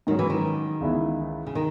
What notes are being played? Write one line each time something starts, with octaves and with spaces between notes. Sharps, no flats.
G#2 D#3 F#3 C#4
E3
D#3
C#2 C#3 E3 B3 E4
C#3
D#3